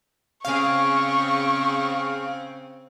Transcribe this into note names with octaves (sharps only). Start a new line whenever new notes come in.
C#3 C4 G#4 F5 C#6